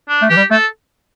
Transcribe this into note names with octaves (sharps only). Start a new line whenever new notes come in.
D4
A3
E3 G4
G3
A3 A4